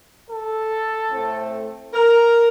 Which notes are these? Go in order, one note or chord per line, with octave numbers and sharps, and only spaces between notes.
A4
A2 A3 C4
A#4